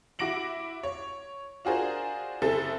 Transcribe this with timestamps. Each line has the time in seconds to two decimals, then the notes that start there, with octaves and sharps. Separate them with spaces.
0.19 E4 F#4 D6 A#6 D7 F#7
0.83 C#5
1.65 D4 F4 F#4 G#4 A#4 C5
2.42 F#1 C4 E4 G#4 A4 A6